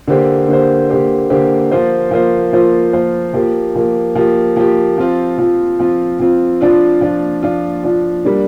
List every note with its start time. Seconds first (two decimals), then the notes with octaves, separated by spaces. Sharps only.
0.08 D3 A#3 G4 C5
0.48 D3 A#3 G4 C5
0.90 D3 A#3 G4 C5
1.30 D3 A#3 G4 C5
1.71 F3 A#3 F4 C5
2.11 F3 A#3 F4 C5
2.53 F3 A#3 F4 C5
2.93 F3 A#3 F4 C5
3.34 F3 A#3 G4
3.76 F3 A#3 G4
4.16 F3 A#3 G4
4.56 F3 A#3 G4
4.98 F3 C4 F4
5.38 F3 C4 F4
5.80 F3 C4 F4
6.20 F3 C4 F4
6.61 F3 D4 F4
7.01 F3 D4 F4
7.42 F3 D4 F4
7.83 F3 D4 F4
8.25 G3 A#3 D4